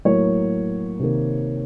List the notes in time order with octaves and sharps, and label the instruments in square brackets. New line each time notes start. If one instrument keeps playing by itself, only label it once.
[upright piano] A2 F#3 A#3 C#5
C3 D#3 A#3